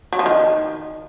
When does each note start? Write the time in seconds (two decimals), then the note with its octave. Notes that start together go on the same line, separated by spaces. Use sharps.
0.13 F#3
0.19 F3
0.26 D#3